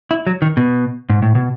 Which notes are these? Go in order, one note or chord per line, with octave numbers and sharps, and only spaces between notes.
E4
F#3
D#3
B2
G#2
A2
B2